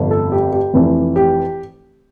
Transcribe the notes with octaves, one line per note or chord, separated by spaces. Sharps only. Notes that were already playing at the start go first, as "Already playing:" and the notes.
Already playing: G1 F2 C3
A4
G4
G4
F1 F2 E3
G4